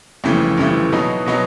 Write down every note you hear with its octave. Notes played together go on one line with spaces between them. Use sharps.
G1 F2 C#3 E3 A3
G1 F2 C#3 E3 A3
B2 F#3 B3 D#4
B2 F#3 B3 D#4